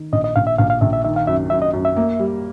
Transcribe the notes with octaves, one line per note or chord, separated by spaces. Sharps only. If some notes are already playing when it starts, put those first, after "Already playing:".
Already playing: D#3
A#1 D#5
D#5
A#1 F5
E5
A#1 F5
F5
A#1 E5
E5
D#3 E5
F5
F#2 E5
F#2 E5
D#5
F#2
E5
A#3
G3